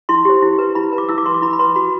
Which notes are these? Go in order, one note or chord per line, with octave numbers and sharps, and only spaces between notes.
E4 C6
G4 C5
E4
B4
E4 B5
B4
D6
E4 E6
D6
B4 C6
D6
E4 B5
B5
B4 C6
F#4 B5